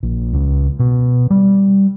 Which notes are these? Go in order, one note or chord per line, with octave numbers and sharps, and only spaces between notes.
A#1
C#2
B2
G3